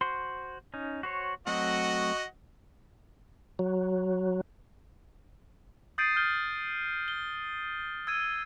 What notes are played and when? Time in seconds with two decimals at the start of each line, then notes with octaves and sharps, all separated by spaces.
0.01 F#4 C5 C6
0.74 C#4 D#4
1.03 F#4 C5 C#5
1.47 F#3 A3 C4 F#4 D#5 F#5
3.59 F#3
5.98 D#6 G6 A6 C7 D7 D#7
6.16 F6 G6 G7
7.08 G7
8.07 E6 G#6 D#7